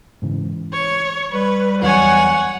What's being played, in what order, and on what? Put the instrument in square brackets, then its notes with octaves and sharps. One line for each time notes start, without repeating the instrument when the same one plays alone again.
[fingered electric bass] G#2 C#3 E3
[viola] C#5
[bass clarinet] G3 [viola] B4
[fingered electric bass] E2 F#3 [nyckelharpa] C#5 G#5 [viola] F#5